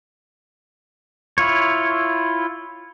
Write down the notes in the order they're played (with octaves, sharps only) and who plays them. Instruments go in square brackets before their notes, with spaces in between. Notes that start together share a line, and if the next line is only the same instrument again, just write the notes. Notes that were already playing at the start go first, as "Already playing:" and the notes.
[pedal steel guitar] E4 F4 C#5